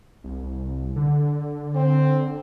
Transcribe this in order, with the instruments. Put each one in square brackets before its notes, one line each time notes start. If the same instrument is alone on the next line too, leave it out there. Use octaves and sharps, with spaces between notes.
[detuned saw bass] C2
D3
[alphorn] C4